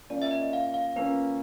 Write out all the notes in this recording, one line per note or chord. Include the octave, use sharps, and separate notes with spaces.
A#3 C#4 F4 D5
E5
D#5
F5
F5
A#3 C#4 F4 B4